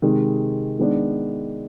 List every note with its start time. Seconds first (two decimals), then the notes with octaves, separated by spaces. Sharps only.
0.02 C3 D#3 G#3
0.79 D#3 G#3 B3 D4